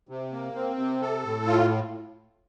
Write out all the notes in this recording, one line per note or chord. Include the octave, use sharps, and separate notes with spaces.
C3
A#3
C4
C3
A4
A2
F4